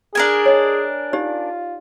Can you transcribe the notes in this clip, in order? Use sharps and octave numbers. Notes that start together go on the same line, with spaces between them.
D4 G#4 A#4 G#5
C#5 D#5
D#4 F4 G4 D5